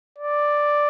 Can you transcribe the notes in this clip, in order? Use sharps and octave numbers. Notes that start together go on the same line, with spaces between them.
D5